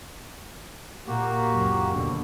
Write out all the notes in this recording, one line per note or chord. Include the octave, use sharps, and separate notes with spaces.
A#2 A#3 F#4 G4
C#2 F#2 F#3
D#2 B2 D3